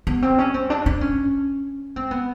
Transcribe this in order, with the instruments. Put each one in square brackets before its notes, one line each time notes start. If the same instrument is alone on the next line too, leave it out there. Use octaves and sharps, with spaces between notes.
[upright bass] B3
C4
C#4
C4
D4
D4
C#4
C4
B3